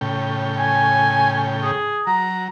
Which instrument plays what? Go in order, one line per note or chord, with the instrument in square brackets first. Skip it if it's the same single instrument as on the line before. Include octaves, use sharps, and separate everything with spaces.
[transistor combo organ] A2 C#3 G5
[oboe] G#5
G#4
[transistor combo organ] F#3 [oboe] A#5